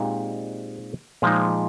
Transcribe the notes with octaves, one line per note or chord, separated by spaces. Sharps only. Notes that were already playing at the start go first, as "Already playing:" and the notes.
Already playing: A#2 G#3 C4 D#4 G4
A#2 F3 G#3 D#4 G#4